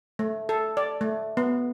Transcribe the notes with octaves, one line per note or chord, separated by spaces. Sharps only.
A3
A4
D5
A3
B3